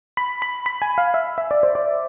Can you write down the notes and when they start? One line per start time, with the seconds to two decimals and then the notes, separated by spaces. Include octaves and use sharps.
0.17 B5
0.42 B5
0.66 B5
0.82 G#5
0.98 F5
1.14 E5
1.38 E5
1.51 D5
1.63 C5
1.75 D5